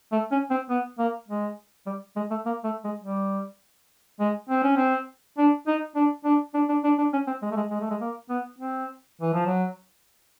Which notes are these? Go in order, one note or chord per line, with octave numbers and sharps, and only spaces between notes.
A3
C#4
C4
B3
A#3
G#3
G3
G#3
A3
A#3
A3
G#3
G3
G#3
C4
C#4
C4
D4
D#4
D4
D4
D4
D4
D4
D4
C#4
C4
G#3
A3
G#3
G#3
A3
G#3
A#3
B3
C4
E3
F3
F#3